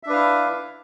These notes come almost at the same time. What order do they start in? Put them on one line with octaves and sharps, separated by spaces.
E5 D4 B4 F5 E4